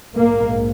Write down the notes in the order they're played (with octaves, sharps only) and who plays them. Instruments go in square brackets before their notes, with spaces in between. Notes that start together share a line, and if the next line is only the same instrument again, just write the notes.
[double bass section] A#1 G#2 A#3